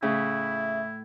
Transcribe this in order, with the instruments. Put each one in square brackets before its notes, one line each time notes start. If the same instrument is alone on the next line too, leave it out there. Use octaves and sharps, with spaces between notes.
[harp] A2 [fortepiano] C#3 [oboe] E4 [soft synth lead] E5